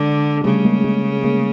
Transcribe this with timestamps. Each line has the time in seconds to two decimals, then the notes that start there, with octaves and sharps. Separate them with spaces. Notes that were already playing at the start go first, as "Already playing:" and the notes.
Already playing: D3 G#3
0.44 C#3 G3 A3
0.65 G#3 A#3
0.84 G#3
1.24 G#3 A#3